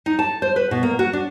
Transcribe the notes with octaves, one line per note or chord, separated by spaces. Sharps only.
D#4
A5
C5
B4
B2
A#3
F#4
D4